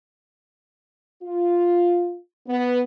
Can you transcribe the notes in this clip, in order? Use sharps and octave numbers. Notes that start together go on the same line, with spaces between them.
F4
B3